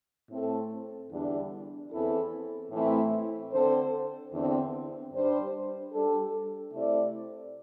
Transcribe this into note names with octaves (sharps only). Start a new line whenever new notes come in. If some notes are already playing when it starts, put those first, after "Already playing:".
A2 A3 C4 A4
E2 D3 G3 D4
E2 E3 C4 E4 A4
A2 E3 A3 C4 E4
D3 C4 A4 C5
E2 D3 C4
G2 G3 D4 C5
G3 D4 A4
C3 A3 E4 A4 D5